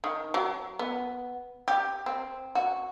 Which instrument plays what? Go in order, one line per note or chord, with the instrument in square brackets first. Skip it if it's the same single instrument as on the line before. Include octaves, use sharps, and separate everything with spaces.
[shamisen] D#3
F#3
B3
G4
C4
F#4